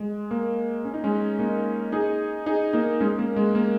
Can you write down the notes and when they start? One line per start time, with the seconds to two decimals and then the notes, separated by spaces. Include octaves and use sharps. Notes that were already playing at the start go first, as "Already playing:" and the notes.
Already playing: G#3
0.31 A#3
0.85 C#4
0.94 D#4
1.04 G#3 C#4
1.39 A#3 D#4
1.92 D#4 G#4
2.46 D#4 G#4
2.73 A#3 D#4
3.00 G#3 C#4
3.19 A#3
3.36 G#3
3.55 A#3